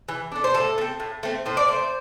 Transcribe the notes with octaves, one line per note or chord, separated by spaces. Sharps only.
E3
A3 D4
C5
A2 A4
A3
C4
A2
A3 C4
A2 C5
D5
A3 C4 C5